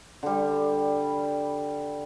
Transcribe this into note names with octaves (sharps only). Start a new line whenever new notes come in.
D3 G3